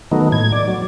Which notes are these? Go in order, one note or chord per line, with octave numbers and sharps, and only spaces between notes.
D#3 F#3 A3 B3 D#4
A2 G#6
D5
F#3